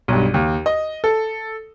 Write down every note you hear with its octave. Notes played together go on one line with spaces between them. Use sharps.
B1 G2
D#2
D#5
A4